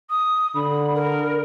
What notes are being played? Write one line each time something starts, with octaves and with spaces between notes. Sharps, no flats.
D#6
D3 B5
A#4